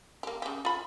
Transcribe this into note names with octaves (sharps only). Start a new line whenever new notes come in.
A#3 G4
C#3 G4
F4 B5